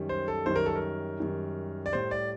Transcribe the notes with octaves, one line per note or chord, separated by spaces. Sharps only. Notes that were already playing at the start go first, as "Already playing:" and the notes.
Already playing: F#2 D#3 G3
C5
A4
F#2 D#3 G3 C5
A#4
A4
A#4
F#2 D#3 G3
D5
A2 G3 C5
D5